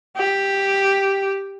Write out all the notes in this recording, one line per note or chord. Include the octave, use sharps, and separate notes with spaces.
G4